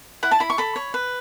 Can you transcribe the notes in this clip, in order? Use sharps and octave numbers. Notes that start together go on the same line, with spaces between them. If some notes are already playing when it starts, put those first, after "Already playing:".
E4 F#5
A5
E4 B5
C#6
A4 B5
C#5
B4